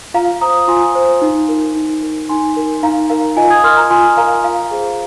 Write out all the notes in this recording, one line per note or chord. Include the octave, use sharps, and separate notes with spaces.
F4 F5 A#5
C5 A#5 D#6
F4 G#5 C6
C5
D#4
A#4
D#4
A#4
D#4 G#5 C6
A#4
D#4 F5 A#5
A#4 F5
F4 D#5 G#5
D#6 G#6
A#4 C6 F6
A#5 D#6
F4 G#5 C6
A#4 F5 A#5
F4 F5 A#5
G#4 C5